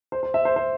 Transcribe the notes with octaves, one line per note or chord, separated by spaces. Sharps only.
C5
C5
E5
C5
C5